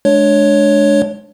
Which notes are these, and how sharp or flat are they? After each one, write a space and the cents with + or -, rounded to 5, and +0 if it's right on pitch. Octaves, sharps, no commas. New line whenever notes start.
G#3 +30 D4 +0 C#5 +5